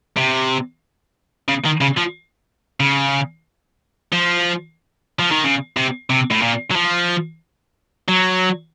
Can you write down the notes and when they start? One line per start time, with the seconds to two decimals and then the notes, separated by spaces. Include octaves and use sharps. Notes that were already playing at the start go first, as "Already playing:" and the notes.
0.17 C3
1.49 C#3
1.65 D#3
1.81 C#3
1.98 F3
2.80 C#3
4.13 F3
5.19 F3
5.31 D#3
5.44 C#3
5.77 C3
6.10 C3
6.31 A2
6.42 A#2
6.71 F#3
6.76 F3
8.08 F#3